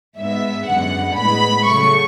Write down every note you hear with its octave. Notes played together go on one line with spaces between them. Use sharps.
G#2 G#3 B3 E5
F#2 D3 G#3 B3 F#5
A2 G#3 B3 B5
C#3 F#3 A3 C#6